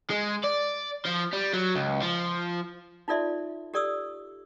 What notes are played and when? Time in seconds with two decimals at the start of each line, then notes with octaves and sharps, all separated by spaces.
0.10 G#3
0.44 D5
1.05 F3
1.33 G3
1.54 F#3
1.75 C#2
2.02 F3
3.08 D#4 F4 A4 D5 E5 C6
3.74 G4 A4 D5 C#6 D#6 E6